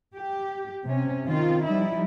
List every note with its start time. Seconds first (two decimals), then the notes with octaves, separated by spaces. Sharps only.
0.15 G4
0.84 C3 C#4
1.25 D#3 C4 F4
1.66 F3 G3 D#4 E4